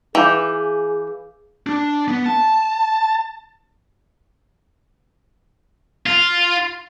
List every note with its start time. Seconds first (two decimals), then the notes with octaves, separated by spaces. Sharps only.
0.15 E3 G#4 F5 D6 G6
1.67 D4
2.08 B3
2.26 A5
6.06 F4